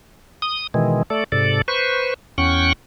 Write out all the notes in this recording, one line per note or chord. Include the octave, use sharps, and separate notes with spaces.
D#6
B2 D#3 E3 G#3
A3 A4 D5
G#2 C3 A4 D5
B4 C5 C#6
E2 C#4 F#5 G5 C#6